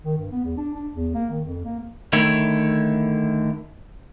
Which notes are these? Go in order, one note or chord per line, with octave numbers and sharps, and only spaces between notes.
D#3
G2
B3
E2
D4
D4
E2
A#3
D#3
F2
A#3
D3 D#3 A3 E4 C#5